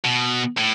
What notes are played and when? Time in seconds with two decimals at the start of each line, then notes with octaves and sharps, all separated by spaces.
0.05 B2
0.58 A2